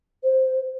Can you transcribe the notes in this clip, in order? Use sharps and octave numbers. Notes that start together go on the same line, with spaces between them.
C5